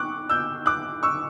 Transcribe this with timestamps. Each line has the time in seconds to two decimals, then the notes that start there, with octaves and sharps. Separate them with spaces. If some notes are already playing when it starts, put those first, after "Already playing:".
Already playing: C#6 D6 F#6
0.30 E6 G6
0.66 D6 F#6
1.03 C#6 E6